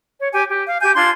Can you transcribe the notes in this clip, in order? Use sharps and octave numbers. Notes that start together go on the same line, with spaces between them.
C#5
G4 G#5
G4
F5
G4 G#5 G6
D4 F4 C6 G#6